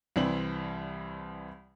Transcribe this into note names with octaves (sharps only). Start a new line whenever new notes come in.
C2 E3 G3 C4 F#7